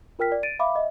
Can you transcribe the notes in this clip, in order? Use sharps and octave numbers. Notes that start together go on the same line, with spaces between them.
F4 A#4 G5 F6 B6
D5
A6 D7 D#7
E5 F5 B5 D6
D#5 E5